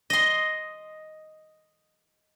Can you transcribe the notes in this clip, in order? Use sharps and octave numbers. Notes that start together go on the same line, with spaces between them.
D#5 C6